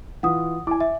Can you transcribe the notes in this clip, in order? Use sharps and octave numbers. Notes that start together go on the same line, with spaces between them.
E3 F4 F#5 D#6
E4 G#5 D6
E5